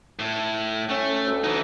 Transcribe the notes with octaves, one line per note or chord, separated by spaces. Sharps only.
A2
A3 C#4
D2
E3 D#4